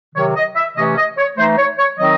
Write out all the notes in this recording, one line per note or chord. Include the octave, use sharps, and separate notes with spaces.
C3 D#3 F#3 C#5
D#5
E5
C3 E3 A3 C#4 D#5
D#5
C#5
E3 A3 D#4 C5
C#5
C#5
D#3 F#3 C4 D#4 D#5